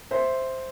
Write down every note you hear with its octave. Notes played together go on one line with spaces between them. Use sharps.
C5 E5